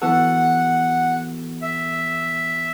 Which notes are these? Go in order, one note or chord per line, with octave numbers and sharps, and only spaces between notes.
E3 B3 F#4 A4 F#5
E5